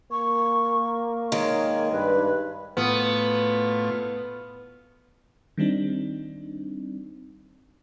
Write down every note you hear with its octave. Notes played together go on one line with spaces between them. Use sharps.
A#3 C#6
D#3 G#3 C#5
G2 B4
A2 B3 F4
D#3 G3 C4 D4 D#4